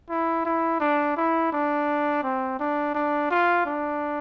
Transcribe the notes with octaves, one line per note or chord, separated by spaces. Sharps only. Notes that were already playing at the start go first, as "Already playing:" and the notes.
E4
E4
D4
E4
D4
C4
D4
D4
F4
D4